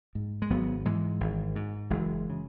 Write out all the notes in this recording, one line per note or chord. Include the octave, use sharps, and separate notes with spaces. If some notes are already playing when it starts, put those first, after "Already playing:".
G#2
G#3
G#1 F#3 B3
G#2 E3 G#3
G#1
G#2
F#1 E3 G#3
C#3